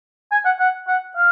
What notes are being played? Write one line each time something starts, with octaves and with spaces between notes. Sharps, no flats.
G#5
F#5
F#5
F#5
F5